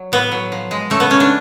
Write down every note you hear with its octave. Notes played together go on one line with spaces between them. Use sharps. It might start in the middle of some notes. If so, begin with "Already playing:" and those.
Already playing: F#3
A2 B3
F#3
F3
G#3
C#3 A3
B3
C#3 C#4
D4